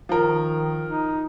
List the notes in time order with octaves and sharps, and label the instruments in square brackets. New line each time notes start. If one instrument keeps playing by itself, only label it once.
[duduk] D#3 [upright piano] F3 A#4
[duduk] D#4